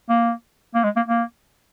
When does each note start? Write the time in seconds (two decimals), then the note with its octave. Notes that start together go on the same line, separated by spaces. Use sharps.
0.09 A#3
0.75 A#3
0.84 G#3
0.96 A#3
1.08 A#3